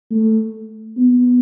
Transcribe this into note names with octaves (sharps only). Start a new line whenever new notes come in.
A3
B3